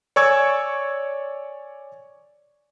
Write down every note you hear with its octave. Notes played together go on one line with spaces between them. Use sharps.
C#5 D5 G#5 C#6 E6 G#6